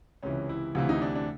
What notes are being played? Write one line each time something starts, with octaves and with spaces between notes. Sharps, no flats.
C#2 C3 E3 C#4
E4
D2 C3 E3 F4
D#4
D4
D4